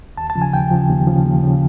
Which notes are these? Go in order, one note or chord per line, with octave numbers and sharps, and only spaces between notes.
D#2 A5
A5
C#3 F3
G#5
D#2 G5
C#3 F3
D#2
C#3 F3
D#2
C#3 F3